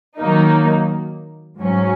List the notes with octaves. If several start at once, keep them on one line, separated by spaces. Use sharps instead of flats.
D#3 F#3 A#3 D#4
G#2 F#3 C#4